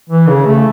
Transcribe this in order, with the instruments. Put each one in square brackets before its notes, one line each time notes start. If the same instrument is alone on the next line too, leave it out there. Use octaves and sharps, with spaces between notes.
[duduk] E3
C#3
A3